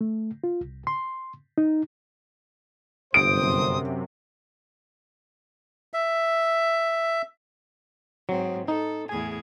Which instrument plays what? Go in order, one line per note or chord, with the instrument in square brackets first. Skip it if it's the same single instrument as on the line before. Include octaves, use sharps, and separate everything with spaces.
[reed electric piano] A3
F4
C2
C6
D#4
[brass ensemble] G1 C5 [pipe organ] F#2 C3 [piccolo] D#6 [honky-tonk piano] D7
[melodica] E5
[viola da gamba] G#2 C4 [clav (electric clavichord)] F#3
[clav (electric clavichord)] D#4 [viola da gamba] A4
[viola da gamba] E2 A2 G#4 [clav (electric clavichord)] G#5